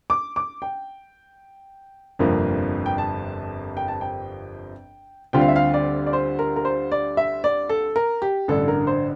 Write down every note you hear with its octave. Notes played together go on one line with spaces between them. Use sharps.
D6
D6
G5
G1 F2 C3 F3 A#3
G5
A5
G5
A5
G5
D2 D3 G3 C4 F4 G5
F5
E5
F5
D5
D5
C5
A#4
A#4
C5
D5
E5
D5
A4
A#4
G4
A1 G2 D3 A4
A#4
C5